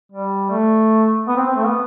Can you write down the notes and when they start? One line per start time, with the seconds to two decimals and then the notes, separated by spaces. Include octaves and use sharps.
0.12 G3
0.51 A3
1.27 B3
1.36 C4
1.47 C4
1.57 A3
1.66 B3